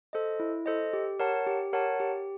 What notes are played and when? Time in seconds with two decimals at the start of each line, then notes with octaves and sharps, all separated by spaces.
0.13 A4 C5 D#5
0.40 E4
0.66 A4 C5 D#5
0.93 G4
1.20 A#4 C#5 F#5 A5
1.47 G4
1.73 A#4 C#5 F#5 A5
2.00 G4